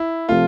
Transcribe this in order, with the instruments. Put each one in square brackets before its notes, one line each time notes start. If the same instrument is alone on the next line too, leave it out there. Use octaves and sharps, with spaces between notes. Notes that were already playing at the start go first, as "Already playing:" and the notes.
Already playing: [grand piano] E4
[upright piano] C3 F3 A3 C4 [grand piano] F4